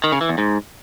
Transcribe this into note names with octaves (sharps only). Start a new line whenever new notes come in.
D#3
C#3
E3
E2
G#2